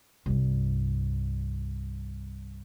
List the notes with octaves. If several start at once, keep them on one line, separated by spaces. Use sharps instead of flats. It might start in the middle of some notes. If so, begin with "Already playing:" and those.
C2 G2